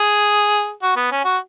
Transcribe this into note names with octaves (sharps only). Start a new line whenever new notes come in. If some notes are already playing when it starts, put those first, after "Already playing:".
Already playing: G#4
F#4
B3
C#4
F#4